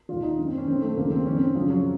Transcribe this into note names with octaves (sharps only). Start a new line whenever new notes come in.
D#2 D#3 F4
D#4
F#2 D#3
C4
C#4
F#2 D#3 C4
A3
D#2 C#3 F3 A#3
C4
F#2 D#3 C#4
C4
F#2 C#3 F3
F#3